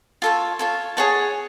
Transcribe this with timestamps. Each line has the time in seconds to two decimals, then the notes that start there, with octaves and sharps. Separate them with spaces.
0.22 F4 A4 C#5
0.59 F4 A4 C#5
0.97 G#4 C#5 F#5 A5